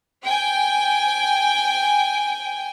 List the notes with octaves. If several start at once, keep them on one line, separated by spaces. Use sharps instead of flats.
G5 G#5